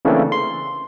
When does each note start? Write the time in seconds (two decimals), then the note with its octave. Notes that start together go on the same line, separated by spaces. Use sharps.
0.05 C#3 E3 A3 A#3 C4 D4
0.32 C6